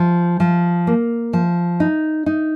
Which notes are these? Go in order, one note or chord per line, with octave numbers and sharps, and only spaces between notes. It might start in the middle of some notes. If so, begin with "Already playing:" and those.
Already playing: F3
F3
A#3
F3
D#4
D#4